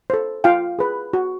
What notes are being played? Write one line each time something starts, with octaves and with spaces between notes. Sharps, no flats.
A4 C5
F4 F5 G5
G#4 B4
F#4